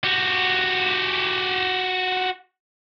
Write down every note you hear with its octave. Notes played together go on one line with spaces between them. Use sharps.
F#4 G4